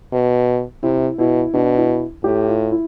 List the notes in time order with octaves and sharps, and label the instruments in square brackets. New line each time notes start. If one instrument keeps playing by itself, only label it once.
[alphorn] B2
[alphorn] C3 [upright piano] E4
[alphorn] B2 [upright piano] E4
[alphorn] B2 [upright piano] D4
[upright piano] E4
[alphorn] A2 [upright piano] G4
[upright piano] F4
E4